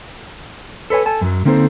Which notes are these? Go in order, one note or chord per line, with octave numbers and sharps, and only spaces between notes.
A4 B4 C#5 G#5
A4 G#5 A5
F#2 F#3
D3 A#3 C4 D#4 A4 C5